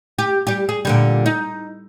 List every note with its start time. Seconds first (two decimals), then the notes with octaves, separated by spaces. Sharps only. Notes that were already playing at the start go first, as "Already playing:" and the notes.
0.18 G4
0.47 G3 G4
0.69 G#4
0.85 A#2 D3 G3
1.26 D#4